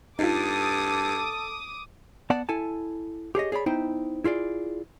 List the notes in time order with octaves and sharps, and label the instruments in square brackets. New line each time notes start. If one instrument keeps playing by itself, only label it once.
[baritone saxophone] G2 [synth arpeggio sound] D#4 F4 [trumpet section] A4 [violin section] D6 D#6
[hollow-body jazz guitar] B3 D5 F#5 A5
E4 A4 G#5 A5
G4 G#4 C#5 D#5
G#4 C#5 D5 B5
B3 D#4 E4 C5 G5
E4 F4 G#4 D5